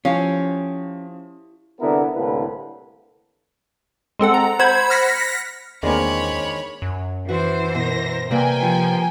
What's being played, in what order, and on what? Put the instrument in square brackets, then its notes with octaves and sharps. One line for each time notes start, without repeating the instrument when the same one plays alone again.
[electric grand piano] F3 [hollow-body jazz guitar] C#4 [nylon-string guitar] E4 G4 F5
[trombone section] C2 D3 B3 E4 A#4
C2 A2 D3 A#3 B4
[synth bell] G#3 C4 A4 F#5
A#5
C5 F#5 B5 G#6
F6 F#6 A#6 B6 C#7
[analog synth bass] E2 [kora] D#3 G#3 [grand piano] A#3 C4 D4 [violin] C#5 B5
[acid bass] F#2
[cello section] E3 C5 [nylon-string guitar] F#4 B4
[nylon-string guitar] B2 [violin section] A#4 A#6
[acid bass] C3 [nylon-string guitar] G3 A#3 B4 [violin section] G5 G#5
[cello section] F3